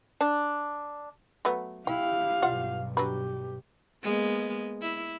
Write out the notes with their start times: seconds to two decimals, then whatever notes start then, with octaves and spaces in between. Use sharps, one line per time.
0.21 D4
1.45 F#3 A3 B3
1.87 E4 G4 F5 G5
2.42 B1 G2 F4 D5 F#5
2.97 F#3 D4 G4 B4
4.03 G#3 A#3 B3
4.82 E4